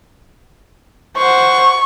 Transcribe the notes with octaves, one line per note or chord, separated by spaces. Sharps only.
C5 F#5 C#6